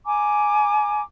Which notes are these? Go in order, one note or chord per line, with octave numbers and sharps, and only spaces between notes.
G#5 A#5 D6